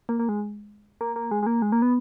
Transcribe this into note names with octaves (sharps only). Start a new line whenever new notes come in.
A#3
A#3
G#3
A#3
A#3
G#3
G#3
A#3
G#3
A#3
B3